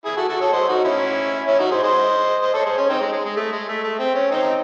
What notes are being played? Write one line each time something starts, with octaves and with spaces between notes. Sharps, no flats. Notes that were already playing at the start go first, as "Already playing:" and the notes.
E4 G#4
F#4 A4
F#4 A4
A4 C#5
C5 D#5
D#4 F#4
C#4 E4
C#4 E4
D#4 F#4
G#4 C5
C5 D#5
C5 D#5
A4 C#5
G#4 C5
C#4
C4 D#4
G#3
G#3
G#3
A3
G#3
A3
A3
C4
C#4
C4 D#4